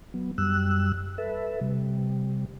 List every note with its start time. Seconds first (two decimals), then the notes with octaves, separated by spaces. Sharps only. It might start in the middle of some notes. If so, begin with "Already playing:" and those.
0.14 F#3 B3
0.38 F#2 G3 E6 F#6
1.18 A4 B4 E5
1.61 C3 G3